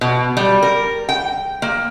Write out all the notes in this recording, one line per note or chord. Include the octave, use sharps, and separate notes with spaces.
B2
G3
A#4
G5
A#3